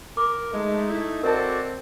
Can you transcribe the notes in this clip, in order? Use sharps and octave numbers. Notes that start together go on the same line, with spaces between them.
A#4 D6
G#3 A3 D#4
E4
C4 F#4 A4 A#4 D5 D#5 A5